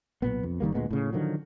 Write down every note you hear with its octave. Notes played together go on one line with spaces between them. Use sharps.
B1 A#2 B3
F2
F#1 D#3 G3 A#3
D2 A#2 G#3 B3
A2 C#3
D3 D#3 F3 F#3